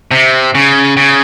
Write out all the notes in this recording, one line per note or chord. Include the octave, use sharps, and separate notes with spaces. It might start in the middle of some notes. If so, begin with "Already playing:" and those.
C3
C#3
C#3